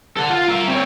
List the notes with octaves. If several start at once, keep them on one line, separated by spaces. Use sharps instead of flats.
A4 F#5
F4
A#4 E5
C4 C#5